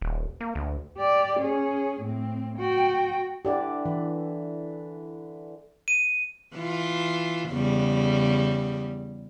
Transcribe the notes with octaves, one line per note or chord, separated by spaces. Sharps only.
D#1
A#3
D2
G4 D5
C#4 G#4
A2 C4
F#4 G5
D3 E3 G4 D5
E3 B4
D#7
E3 F4
E2 C#3 G3